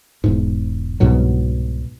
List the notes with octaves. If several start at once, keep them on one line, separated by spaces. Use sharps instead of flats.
E1 G#2
C2 G#2 B2 F#3